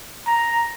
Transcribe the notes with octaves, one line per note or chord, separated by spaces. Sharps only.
A#5